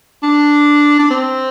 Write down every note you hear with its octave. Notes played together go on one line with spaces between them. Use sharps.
D4
D4
C4